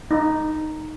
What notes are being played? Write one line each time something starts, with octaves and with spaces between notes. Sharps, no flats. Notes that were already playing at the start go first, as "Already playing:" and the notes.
D#4